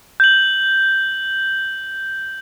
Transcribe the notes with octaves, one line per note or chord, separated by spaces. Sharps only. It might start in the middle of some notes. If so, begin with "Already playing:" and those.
G6 F#7